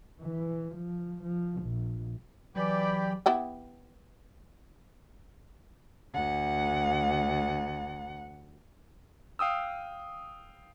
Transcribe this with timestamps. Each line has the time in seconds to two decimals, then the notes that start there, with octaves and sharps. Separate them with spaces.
0.22 E3
0.75 F3
1.23 F3
1.62 A#1
2.56 E3 F#3 G4 D5 G5 B5
3.26 B3 E4 G4
6.14 D2 F#5
9.39 F5 G5 D#6 E6